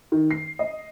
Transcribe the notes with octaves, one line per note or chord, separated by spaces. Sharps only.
D#3
C7
D#5